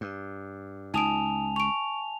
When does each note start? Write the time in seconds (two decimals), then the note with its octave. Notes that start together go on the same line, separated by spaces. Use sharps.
0.01 G2
0.94 C#2 D#4 G#5 A5 D#6 D7 F7
1.56 C#6 D7 F7